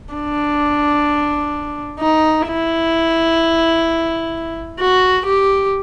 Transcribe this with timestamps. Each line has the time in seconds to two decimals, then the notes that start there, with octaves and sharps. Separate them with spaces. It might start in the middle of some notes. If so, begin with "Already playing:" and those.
0.14 D4
2.00 D#4
2.47 E4
4.80 F#4
5.26 G4